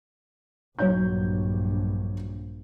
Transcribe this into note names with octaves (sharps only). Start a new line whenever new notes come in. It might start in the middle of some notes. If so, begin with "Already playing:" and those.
A#1 G2 F#3 C#5 G6